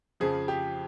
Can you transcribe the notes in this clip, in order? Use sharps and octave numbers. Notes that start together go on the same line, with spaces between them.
F2 C#3 F3 G#4
G4